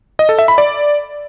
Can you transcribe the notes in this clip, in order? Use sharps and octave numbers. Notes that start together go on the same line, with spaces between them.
D#5
A4
E5
B5
D5